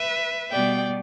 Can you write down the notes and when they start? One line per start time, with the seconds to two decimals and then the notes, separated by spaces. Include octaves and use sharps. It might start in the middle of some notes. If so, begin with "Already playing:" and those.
Already playing: B4 E5
0.52 B2 G3 B3 D5 G5